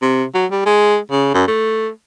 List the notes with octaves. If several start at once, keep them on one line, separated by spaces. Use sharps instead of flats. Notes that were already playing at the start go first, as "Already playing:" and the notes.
C3
F#3
G3
G#3
C#3
F#2
A3